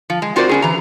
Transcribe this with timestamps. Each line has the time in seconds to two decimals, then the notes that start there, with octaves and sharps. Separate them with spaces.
0.10 F3
0.22 G#3
0.36 C4 F4 F#4 A#4 C5 D5
0.49 B3 C#4 G#4
0.62 E3 A#5